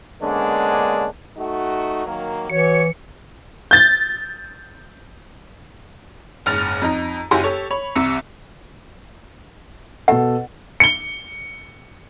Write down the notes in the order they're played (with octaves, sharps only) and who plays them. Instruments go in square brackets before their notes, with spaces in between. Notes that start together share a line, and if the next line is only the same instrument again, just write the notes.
[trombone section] D3 G#3 A#3 B3 C#4 D4
[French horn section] A3 D#4 F#4
D#3 F#3 A#3
[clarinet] E3 [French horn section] F#4 C#5 [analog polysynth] C#7
[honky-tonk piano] G6 A6
F#1 G#2 F6 A6 F7
F2 D#4 A#5
F#1 E4 F#4 G4 G#5 C6
G4 A4 C#5
C#5 B5
C2 C3 A#5 E6 C#7
[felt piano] B2 A4 [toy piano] F#5
[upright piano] C#7 G7